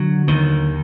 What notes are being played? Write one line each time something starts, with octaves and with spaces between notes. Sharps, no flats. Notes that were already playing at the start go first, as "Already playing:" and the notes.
Already playing: D3 F#3
D#2 D#3